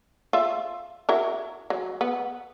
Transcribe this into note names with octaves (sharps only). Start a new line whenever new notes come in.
F4 E5
E4 F#4 A#4
F#3
B3